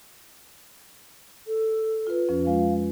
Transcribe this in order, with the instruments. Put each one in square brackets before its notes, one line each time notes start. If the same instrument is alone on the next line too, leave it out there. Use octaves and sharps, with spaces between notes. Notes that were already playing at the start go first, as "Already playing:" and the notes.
[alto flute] A4
[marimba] F4 B4
F2 F3 C#4
[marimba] F3 G#3 F4 [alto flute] F5